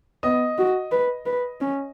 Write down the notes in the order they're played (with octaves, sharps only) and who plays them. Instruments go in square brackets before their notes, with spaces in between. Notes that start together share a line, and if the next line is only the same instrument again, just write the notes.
[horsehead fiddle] B3 [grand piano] D#5 D#6
[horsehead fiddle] F#4
B4
B4
C#4